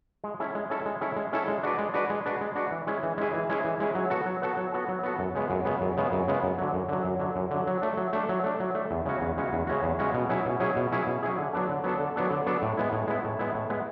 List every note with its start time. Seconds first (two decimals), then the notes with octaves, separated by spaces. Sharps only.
0.24 G#3
0.40 C#4 E4 A4
0.55 G#3
0.70 C#4 E4 A4
0.85 G#3
1.01 C#4 E4 A4
1.16 G#3
1.33 C#4 E4 A4
1.48 G#3
1.63 D4 F#4 B4 D5
1.78 G#3
1.94 D4 F#4 B4 D5
2.10 G#3
2.26 D4 F#4 B4 D5
2.41 G#3
2.55 D4 F#4 B4 D5
2.71 E3
2.87 G#3 C#4 E4 G#4
3.03 E3
3.18 G#3 C#4 E4 G#4
3.34 E3
3.49 G#3 C#4 E4 G#4
3.64 E3
3.80 G#3 C#4 E4 G#4
3.95 F#3
4.10 B3 F#4 A4
4.26 F#3
4.42 B3 F#4 A4
4.57 F#3
4.72 B3 F#4 A4
4.88 F#3
5.03 B3 F#4 A4
5.19 F#2
5.35 C#3 G#3 B3
5.50 F#2
5.65 C#3 G#3 B3
5.81 F#2
5.97 C#3 G#3 B3
6.12 F#2
6.28 C#3 G#3 B3
6.43 F#2
6.58 D3 F#3
6.73 F#2
6.89 D3 F#3
7.04 F#2
7.20 D3 F#3
7.36 F#2
7.51 D3 F#3
7.67 F#3
7.82 A3 D4
7.97 F#3
8.13 A3 D4
8.29 F#3
8.44 A3 D4
8.60 F#3
8.75 A3 D4
8.91 E2
9.06 C#3 G#3 C#4 F#4
9.21 E2
9.37 C#3 G#3 C#4 F#4
9.53 E2
9.67 C#3 G#3 C#4 F#4
9.83 E2
9.99 C#3 G#3 C#4 F#4
10.14 B2
10.29 F#3 C#4 E4 G#4
10.46 B2
10.60 F#3 C#4 E4 G#4
10.76 B2
10.92 F#3 C#4 E4 G#4
11.07 B2
11.23 F#3 C#4 E4 G#4
11.38 D3
11.53 F#3 B3 D4 A4
11.69 D3
11.84 F#3 B3 D4 A4
12.00 D3
12.16 F#3 B3 D4 A4
12.31 D3
12.46 F#3 B3 D4 A4
12.62 A2
12.77 G#3 B3 E4
12.92 A2
13.07 G#3 B3 E4
13.24 A2
13.39 G#3 B3 E4
13.54 A2
13.70 G#3 B3 E4